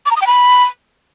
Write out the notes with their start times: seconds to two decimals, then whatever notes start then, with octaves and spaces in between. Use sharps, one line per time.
0.06 D6
0.11 A#5
0.16 D#6
0.21 G5
0.27 B5